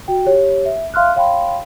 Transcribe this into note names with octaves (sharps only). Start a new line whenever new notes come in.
F#4 G5
G4 C#5
E5
E5 F5 C6 F6 F#6
C#5 F5 G5 B5 C6